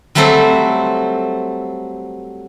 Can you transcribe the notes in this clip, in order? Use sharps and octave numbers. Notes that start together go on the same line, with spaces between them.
F#3 G3 A3 C4 A4 C5